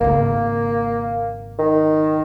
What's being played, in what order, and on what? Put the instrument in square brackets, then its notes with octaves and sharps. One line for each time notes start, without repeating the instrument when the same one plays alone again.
[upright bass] G#1 C#3 [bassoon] A#3
[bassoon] D#3